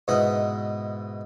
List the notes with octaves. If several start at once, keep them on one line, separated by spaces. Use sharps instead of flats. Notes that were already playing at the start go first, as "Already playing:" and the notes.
G#2 B2 B3 E4 D#5 B5